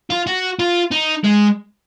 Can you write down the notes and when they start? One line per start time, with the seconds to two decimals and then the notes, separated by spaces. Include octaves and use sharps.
0.10 F4
0.27 F#4
0.59 F4
0.91 D#4
1.24 G#3